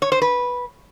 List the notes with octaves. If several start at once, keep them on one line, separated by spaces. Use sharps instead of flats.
C#5
C5
B4